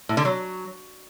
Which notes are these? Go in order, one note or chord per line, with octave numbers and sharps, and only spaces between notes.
A2
D3
F#3